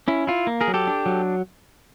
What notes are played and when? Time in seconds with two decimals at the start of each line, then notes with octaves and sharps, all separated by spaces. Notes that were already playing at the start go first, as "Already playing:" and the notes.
0.08 C#4 E4
0.27 E4 F4
0.47 A#3
0.61 G#4 A#4
0.68 F#3
0.74 G4 A4
0.87 D4
1.06 F#3